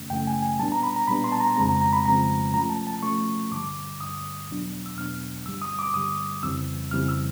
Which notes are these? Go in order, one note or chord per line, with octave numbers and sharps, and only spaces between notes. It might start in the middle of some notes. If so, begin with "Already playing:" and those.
Already playing: F#2 C#3 E3 A3 C#4
F#2 C#3 E3 A3 C#4 G5
G#5
G#5
A#2 G3 B3 D4 A5
A#5
B5
A#5
A#2 G3 B3 D4 B5
C6
A5
A#5
F2 C#3 F3 G#3 C4 A#5
A#5
A#5
B5
F2 C#3 F3 G#3 C4 A#5
C3 F3 A3 C#4 A#5
A5
A5
C3 F3 A3 C#4 C#6
G2 D3 G3 D6
G2 D3 G3 D#6
E2 B2 F#3 B3 D4
E6
E2 B2 F#3 B3 D4 F6
G2 D3 G3 E6
D#6
D6
G2 D3 G3 D#6
F2 C#3 E3 G3 C4 E6
F2 C#3 E3 G3 C4 F6
E6